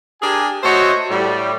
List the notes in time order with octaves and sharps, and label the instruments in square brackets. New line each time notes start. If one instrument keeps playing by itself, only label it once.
[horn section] D4 G4 G#4 A#4 G#5
A3 F#4 C5 C#5 D#5 E5
A2 G3